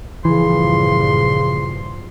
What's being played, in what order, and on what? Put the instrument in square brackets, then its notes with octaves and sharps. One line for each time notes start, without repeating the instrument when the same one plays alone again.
[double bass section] A#1 G2 F3 [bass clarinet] C#3 [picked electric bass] E3 [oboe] C6